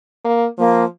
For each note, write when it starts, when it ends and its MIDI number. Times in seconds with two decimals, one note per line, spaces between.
0.25 0.45 58
0.58 0.85 53
0.58 0.84 58